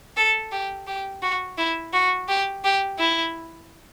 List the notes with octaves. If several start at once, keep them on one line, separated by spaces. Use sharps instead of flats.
A4
G4
G4
F#4
E4
F#4
G4
G4
E4